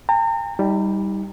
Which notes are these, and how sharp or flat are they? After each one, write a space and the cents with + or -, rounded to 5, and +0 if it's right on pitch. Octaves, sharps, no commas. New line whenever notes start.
G5 +45 A#5 -40
G3 +0 D#4 +25